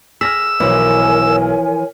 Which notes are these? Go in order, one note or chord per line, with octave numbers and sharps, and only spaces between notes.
G#4 E6 F6 A#6 B6
B1 E3 F3 A#4 C#5 G#5